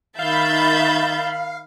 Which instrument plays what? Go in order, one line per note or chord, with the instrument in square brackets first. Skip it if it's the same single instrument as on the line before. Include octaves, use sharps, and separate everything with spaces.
[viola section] D#3 B5 [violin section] E5 G6 A6 [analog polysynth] F5